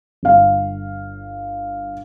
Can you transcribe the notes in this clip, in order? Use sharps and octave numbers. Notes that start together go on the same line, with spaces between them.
G1 F5